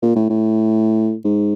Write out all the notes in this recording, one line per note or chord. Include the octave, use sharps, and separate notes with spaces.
A#2
A2
A2
G#2